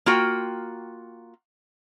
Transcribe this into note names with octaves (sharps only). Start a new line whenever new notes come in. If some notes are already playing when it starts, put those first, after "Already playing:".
A#3 F4 F#4 G5